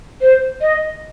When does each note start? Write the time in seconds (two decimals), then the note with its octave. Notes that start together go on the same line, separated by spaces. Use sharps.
0.21 C5
0.61 D#5